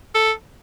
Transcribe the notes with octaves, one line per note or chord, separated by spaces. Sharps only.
A4